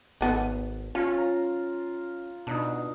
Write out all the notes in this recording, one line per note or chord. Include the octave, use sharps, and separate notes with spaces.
G#1 D#3 B3 A4
F3 C#4 F4
A#5
B2 D4 D#4